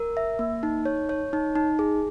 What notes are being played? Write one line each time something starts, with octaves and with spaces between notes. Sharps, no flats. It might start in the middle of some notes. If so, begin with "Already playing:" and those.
Already playing: A#4
E5
A#3
D#4
C#5
C#5
D#4
D#4
G#4